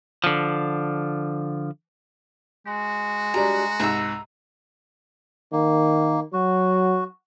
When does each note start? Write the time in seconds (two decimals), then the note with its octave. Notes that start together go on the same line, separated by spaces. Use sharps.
0.24 D3 F3
2.67 G#3 F#4
3.34 F#3 G3 D4 A#5
3.80 C2 G#2 A#5 E6
5.52 D#3 A#3
6.33 F#3 F#4